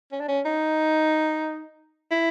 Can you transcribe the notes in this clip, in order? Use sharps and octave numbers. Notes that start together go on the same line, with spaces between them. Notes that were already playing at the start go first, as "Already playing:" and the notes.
C#4
D4
C#4
D#4
E4